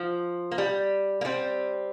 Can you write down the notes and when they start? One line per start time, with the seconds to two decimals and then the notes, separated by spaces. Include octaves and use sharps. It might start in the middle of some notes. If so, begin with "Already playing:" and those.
Already playing: F3
0.51 A#3
0.58 G3
1.21 A#3
1.25 G3 C4